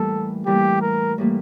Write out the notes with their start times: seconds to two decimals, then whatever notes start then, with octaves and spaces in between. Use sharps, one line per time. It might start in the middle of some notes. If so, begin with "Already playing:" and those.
Already playing: A2 E3 G3 A#3 A4
0.46 A2 E3 G3 A#3 G4
0.82 A#4
1.18 A2 E3 G3 A#3